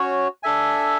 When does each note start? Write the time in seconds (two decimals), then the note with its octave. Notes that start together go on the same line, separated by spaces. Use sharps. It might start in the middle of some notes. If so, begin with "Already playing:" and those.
Already playing: C#4 F#4 C#5
0.43 D4 A4 E5 G#5